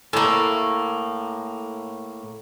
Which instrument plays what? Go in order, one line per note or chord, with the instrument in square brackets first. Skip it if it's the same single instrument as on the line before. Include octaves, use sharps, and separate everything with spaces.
[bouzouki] A2 A#3